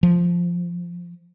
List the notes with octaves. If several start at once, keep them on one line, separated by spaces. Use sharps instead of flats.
F3